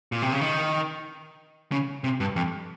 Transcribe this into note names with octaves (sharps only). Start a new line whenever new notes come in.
A#2
C3
C#3
D#3
C#3
C3
G2
F2